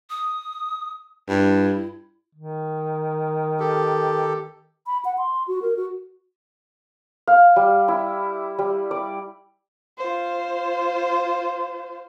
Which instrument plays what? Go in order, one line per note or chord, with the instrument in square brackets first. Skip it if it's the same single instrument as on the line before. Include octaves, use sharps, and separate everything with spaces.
[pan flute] D#6
[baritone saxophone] G2 [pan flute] E4
[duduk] D#3
[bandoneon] G4 A4
[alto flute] B5
F#5
C6
F#4
A#4
F#4
[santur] F5
G3
E4
G3
D5
[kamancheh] F4 C5